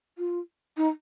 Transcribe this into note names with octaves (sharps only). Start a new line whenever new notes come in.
F4
D#4